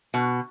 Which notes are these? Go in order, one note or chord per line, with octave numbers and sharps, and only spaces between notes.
B2